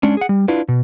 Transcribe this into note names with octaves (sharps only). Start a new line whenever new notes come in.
G#3 C#4 D4
G#4 F#5
G3
D4 E4 F4 B4
B2